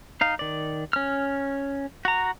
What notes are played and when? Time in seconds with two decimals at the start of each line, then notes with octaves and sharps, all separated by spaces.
0.21 D#4 F5
0.39 D#3 D5
0.93 C#4 F6
2.05 F#4 A#5